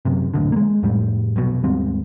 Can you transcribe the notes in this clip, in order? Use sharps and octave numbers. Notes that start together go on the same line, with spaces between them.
F#2 C3
A1 D2 D3
G#3 A#3
F2 A2 G3
F1 B1 B2
D#2 G#2 G3 C4